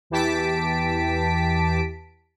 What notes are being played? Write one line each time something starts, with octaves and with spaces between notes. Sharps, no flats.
E2 E3 G4 A5 B6 D7